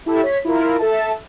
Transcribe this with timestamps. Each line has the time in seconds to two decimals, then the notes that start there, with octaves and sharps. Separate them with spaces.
0.06 E4 G4 A4 E5
0.23 C#5 B6
0.45 E4 F4 A#4
0.79 A4 E5 A5